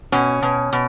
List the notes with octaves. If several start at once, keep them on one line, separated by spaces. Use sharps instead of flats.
B2 C#4
B2
B2